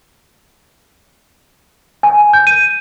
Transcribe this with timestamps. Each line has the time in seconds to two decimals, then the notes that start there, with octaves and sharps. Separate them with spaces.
2.03 G#5
2.33 G6
2.47 D#7